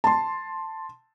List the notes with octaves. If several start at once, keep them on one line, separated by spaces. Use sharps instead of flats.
A5 C6